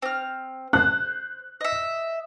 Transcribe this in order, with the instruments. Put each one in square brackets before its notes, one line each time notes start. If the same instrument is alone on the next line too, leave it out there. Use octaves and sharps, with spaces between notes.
[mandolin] C4 F6
[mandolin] C5 [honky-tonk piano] F#6
[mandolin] D#5 E5